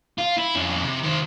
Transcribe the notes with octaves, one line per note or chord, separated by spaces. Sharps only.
F4
E4
F2 C#4
C3
D#3 C5